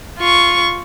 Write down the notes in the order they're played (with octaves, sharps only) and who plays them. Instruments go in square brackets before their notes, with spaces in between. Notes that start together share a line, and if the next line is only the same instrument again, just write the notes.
[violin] F4 C#6